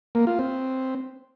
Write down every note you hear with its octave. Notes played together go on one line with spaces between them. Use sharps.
A#3
F4
C4